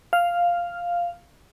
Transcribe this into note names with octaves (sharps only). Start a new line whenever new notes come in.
F5